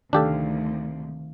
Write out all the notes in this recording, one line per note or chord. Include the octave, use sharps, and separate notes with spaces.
D2 C3 D#3 F3 D4 G4 A4 F5